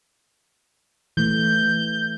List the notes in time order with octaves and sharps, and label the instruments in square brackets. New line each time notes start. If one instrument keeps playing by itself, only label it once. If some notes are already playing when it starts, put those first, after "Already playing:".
[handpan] E3 A3 [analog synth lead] G6